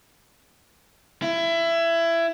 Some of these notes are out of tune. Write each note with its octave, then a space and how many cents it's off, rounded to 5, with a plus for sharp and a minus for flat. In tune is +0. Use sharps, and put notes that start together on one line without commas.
E4 +20